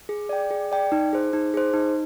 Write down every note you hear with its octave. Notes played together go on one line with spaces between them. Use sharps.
G#4
D5 G5
G#4
D5 G5
D#4
G#4 C5
D#4
G#4 C5
D#4